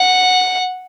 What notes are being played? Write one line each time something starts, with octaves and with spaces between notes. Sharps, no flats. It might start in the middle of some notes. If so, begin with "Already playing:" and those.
Already playing: F#5